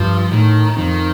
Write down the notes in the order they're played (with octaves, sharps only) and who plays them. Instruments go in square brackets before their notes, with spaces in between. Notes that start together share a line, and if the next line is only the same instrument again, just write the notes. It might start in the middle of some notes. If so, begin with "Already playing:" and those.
Already playing: [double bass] G2 [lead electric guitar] F3
[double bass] A2 [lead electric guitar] D#3
[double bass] F2 [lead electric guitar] D#3